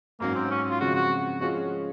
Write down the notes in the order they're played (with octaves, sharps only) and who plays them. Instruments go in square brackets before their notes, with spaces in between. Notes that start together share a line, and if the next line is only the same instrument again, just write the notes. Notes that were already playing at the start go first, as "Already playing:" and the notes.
[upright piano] G#2 F#3 C#4 [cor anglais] A#3
[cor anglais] C4
C#4
F4
[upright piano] C#3 F3 G#3 C4 [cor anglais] F#4
[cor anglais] F#4
[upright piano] F3 G#3 C#4 F4 G#4 [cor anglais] F#4